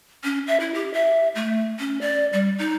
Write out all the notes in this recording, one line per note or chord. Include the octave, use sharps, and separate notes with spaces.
C#4
E5
E4
G4
E5
A3
C#4
D5
G3
D#4